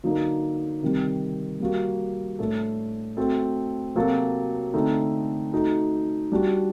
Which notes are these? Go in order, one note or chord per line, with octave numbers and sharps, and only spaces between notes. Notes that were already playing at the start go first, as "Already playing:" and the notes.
D3 F#3 A#3 D#4
C3 D#3 G3
G3 A#3 F#4
A2 A3 D4 A4
A3 C4 F#4 A4
C3 F#3 A#3 F#4 A4
D3 A3 C4 D#4
A3 D#4 F#4 A4
G3 D4 F#4